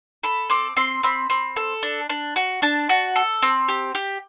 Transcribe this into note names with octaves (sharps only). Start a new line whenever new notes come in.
A4 B5
C4 D6
C4 C6
C4 B5
C4
A4
D4
D4
F#4
D4 A5
F#4
A4
C4
G4
G4